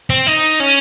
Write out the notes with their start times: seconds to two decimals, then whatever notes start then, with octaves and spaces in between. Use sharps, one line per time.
0.10 C4
0.27 D#4
0.60 C#4